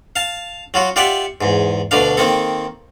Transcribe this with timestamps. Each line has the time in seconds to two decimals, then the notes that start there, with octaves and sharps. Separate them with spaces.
0.16 F5 A5
0.74 F#3 F4 F#4
0.96 F4 G4 D5 E5 F#5
1.41 E2 G#2
1.91 D2 B2 D3 D4 F5
2.17 D#3 A#3 C4 A4